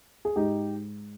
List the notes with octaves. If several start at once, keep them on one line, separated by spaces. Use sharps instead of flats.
G#4
G#2 D#4 G4